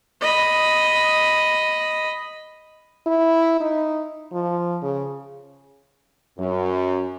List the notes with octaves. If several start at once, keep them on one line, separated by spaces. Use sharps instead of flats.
D#5 B5
E4
D#4
F3
C#3
F#2